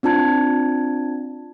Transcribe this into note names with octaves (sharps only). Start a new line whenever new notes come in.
C4 D4 F4 A5 G#6